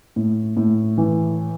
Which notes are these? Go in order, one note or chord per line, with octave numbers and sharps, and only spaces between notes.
A2
A2
E3